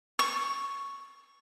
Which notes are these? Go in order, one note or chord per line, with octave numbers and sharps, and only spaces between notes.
C#6